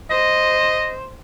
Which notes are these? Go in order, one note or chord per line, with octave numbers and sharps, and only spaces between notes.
C5 D#5